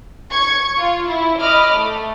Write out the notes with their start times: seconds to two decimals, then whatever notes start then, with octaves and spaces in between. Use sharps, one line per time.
0.31 C#6 G#6 C#7
0.78 F4
1.08 E4
1.40 D#5 B5 D6 F6
1.74 A3